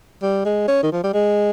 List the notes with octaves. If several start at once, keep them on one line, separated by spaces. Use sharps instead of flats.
G3
G#3
C#4
D#3
F3
G3
G#3